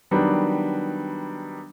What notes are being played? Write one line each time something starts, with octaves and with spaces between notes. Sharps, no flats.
D#3 F#3 G3 B3 D4